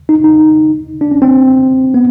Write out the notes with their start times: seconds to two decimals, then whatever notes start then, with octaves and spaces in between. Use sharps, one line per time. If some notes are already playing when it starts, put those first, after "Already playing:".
0.09 D#4
0.24 D#4
1.01 D4
1.11 C#4
1.22 C4
1.94 B3